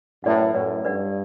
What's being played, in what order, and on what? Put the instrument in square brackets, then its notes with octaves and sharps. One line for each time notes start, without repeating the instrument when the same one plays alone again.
[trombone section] F#2 A2 [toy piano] B4 D5 F#5
[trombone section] F#2 A2 [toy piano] B4 D5 F#5
[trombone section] G2 [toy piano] B4 D5 F#5